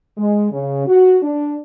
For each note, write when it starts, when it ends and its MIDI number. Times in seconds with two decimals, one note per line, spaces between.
0.18 0.49 56
0.52 0.83 49
0.87 1.17 66
1.22 1.57 62